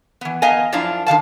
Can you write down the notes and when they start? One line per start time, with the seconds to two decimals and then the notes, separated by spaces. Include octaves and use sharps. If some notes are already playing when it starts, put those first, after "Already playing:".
0.21 E3 B3
0.42 B3 D#5 F5 G#5 A#5
0.72 F#2 F3 D4 E4 F5 A#5
1.06 D3 D#3 F5 A5